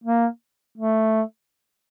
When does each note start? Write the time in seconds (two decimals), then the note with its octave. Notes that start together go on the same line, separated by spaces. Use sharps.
0.04 A#3
0.78 A3